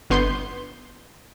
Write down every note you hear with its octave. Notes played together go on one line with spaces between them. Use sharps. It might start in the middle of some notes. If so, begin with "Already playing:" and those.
G1 B3 C6 G6